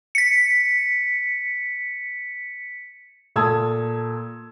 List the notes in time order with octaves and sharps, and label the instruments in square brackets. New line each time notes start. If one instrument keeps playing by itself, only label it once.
[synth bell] B6 C#7
[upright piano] A#2 A4 A5 D#6 E6 G#6